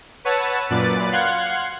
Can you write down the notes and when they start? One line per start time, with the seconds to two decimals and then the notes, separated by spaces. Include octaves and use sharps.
0.24 B4 C#5 F#5 A5 E6
0.70 F#2 A#2 B4 D5 A6
1.12 F5 F#5 C6 F#6 G#6